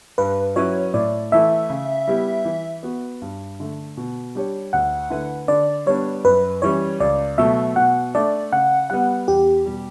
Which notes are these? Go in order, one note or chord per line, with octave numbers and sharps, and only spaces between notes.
G2 B4
F#3 C#4 E4 B4 C#5
A2 D5
E3 A3 E4 E5
C#3
G3 B3 E4 G4
E3
B3 F#4
G2
D3 A3
B2
G3 D4 G4 C#5
D2 F#5
D3 A3 E4 B4
D3 D5
G3 B3 D4 C#5
F#2 B4
E3 G3 C#4 C#5
C#2 D5
B2 F#3 A3 E5
B2 F#5
A3 D4 D5
C#3 F#5
G3 B3 F#5
E2 G4
B2 G3